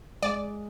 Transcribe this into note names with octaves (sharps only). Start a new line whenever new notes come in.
G#3 D5